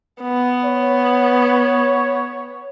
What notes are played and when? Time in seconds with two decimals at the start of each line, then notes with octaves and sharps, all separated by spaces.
0.22 B3
0.64 C#5